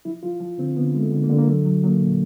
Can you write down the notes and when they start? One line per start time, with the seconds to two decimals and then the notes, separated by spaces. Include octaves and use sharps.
0.05 F3 E4
0.23 F3 F4
0.40 F3
0.58 D3 C4
0.77 D3 B3
0.95 G#3
1.00 A3
1.12 D3
1.23 A#3
1.29 D3
1.38 A#3
1.47 F#3 A3
1.65 F#3
1.84 F#3 A#3
2.01 A#2